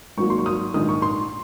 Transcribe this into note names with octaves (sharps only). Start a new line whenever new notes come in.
G#1 G#2 F#3 A#3 C#6
C6
C#6
D#6
A#1 G#2 D#3 D#6
C#6
C6